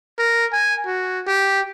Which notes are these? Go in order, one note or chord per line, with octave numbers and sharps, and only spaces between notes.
A#4
G#5
F#4
G4